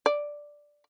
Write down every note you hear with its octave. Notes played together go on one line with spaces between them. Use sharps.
D5